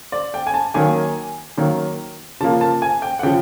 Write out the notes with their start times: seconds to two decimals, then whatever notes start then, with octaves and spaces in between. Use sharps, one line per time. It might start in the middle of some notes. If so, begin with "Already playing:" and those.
0.12 D5
0.34 G5
0.47 G#5
0.54 A5
0.74 D#3 F#3 A#3 G#5
1.57 D#3 F#3 A#3
2.41 C#3 F3 A#3 A5
2.61 A5
2.82 G#5
3.02 G5
3.19 F#5
3.23 C#3 F3 G5